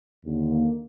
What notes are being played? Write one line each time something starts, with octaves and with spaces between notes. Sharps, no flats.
D#2 D3
A#3